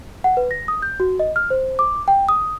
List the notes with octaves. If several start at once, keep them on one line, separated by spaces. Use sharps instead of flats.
F#5
B4
A#6
D#6
G6
F#4
D#5
F6
C5
D6
G5
D#6